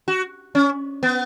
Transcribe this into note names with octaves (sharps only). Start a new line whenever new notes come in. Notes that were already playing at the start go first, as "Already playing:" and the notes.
F#4
C#4
B3